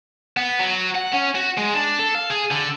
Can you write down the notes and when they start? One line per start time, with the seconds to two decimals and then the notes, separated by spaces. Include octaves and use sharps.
0.37 B3
0.60 F#3
0.96 F#5
1.13 C#4
1.35 F#4
1.58 G#3
1.74 D4
1.99 A4
2.15 F5
2.30 G#4
2.51 D3